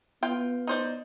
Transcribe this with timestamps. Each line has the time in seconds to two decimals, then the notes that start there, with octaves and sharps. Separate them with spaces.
0.23 B3 F4 G5
0.67 D#4 C5 D5